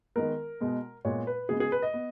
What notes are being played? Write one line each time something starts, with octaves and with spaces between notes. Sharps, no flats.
D#3 G#3 B3 A#4
B2 G#3 B3
A#2 G#3 B3 C#5
B4
C#3 G#3 B3 G#4
G#4
B4
D#5
B3